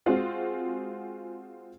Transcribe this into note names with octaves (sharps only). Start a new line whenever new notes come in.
G#3 C4 F4 F#4 G#4